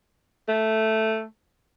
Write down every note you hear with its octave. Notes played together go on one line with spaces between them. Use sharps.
A3